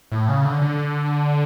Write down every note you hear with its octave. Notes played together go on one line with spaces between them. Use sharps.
A2
C#3
D3
D3